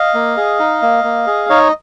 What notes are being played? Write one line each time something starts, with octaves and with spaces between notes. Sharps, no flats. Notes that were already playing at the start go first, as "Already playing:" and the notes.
Already playing: D#5 F5
A#3
G#4
D#4
A#3
A#3
G#4
D#4 C#5 D#5